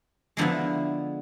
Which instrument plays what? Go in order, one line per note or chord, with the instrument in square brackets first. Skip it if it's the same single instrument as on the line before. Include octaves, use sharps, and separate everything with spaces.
[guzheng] D3 F3 G#3 B3 E4